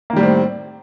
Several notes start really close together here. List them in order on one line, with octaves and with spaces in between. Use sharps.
A#3 D#3 G3 A2 C4